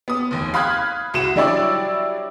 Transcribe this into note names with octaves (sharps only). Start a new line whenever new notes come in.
B3 D#6
F1 D#2
F5 B5 D#6 F#6 G#6
C2 F#4 E7
F#3 G3 D4 E4 C#5 D5